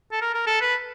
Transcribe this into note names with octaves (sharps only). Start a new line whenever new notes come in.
A4
A#4
A#4
A4
B4